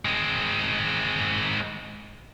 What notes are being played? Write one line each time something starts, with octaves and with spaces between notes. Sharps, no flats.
G#3 C4